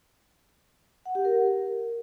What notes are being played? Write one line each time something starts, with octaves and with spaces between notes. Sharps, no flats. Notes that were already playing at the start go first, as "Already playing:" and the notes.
F#5
G4
A#4